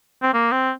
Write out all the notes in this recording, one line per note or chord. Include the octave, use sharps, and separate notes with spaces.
C4
A#3
C4